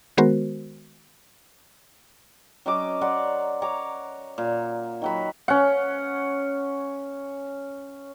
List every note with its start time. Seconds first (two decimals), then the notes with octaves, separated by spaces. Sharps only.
0.17 D#3 G#3 B3 F#4 A#4 C5
2.66 F#3 C#4 D#5 D6
3.01 A#4 D5 F#5 C6
3.62 C#5 A#5 D6
4.38 A#2
5.02 D#3 F#3 B5
5.48 C#4 F#5